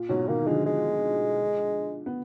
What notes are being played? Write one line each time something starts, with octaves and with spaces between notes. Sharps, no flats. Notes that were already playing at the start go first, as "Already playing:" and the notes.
Already playing: A#2
G#2 B2 F#3
B2 D#3 A#3
D#3
D3 F3 G#3
G#3
B3